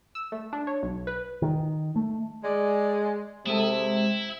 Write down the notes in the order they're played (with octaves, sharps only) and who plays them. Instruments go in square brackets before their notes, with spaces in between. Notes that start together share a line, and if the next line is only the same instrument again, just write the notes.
[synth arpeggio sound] E6
A3
D4
C#5
B1
B4
[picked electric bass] D#3
A3
[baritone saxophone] G#3 [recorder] D5
[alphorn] C3 [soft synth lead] G#3 [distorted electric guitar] E4 [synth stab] A4 D#6